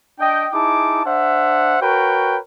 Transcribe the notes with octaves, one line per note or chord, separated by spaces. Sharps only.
D4 D#5 G5
D#4 E4 G#4 A5 D6
D4 C5 E5 F#5
F#4 A#4 B4 C#5 G5